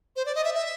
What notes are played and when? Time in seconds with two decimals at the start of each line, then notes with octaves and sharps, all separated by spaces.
0.16 C5
0.26 D5
0.35 D#5
0.44 E5
0.55 E5